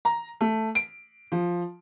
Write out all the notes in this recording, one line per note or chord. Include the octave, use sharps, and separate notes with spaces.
A#5
A3
D7
F3